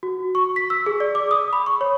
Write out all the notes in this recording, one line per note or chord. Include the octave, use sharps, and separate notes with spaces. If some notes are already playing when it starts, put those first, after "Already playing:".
F#4
C#6
B6
E6
G#4
D5
D6
D#6
B5
C#6
C#5